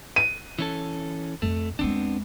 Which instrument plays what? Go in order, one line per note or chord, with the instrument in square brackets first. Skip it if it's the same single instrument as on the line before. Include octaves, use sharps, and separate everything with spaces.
[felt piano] D#7
[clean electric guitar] E3 C#4 A4
[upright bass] F2 [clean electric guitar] A3
[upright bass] E2 G#3 [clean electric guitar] B3 C4 D4